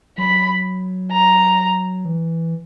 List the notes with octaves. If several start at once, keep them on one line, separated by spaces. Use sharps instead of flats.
F#3 B5
A#5
E3